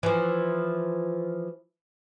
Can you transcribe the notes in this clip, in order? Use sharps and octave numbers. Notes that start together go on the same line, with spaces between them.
E3 F3